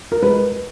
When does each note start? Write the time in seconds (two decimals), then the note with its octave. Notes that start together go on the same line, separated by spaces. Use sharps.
0.12 A#4
0.22 G#3 B4